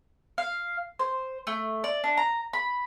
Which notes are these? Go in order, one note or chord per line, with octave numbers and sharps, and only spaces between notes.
F5
C5
A3
D5
D4
A#5
B5